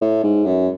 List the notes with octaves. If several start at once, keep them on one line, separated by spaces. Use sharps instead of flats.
A2
G#2
F#2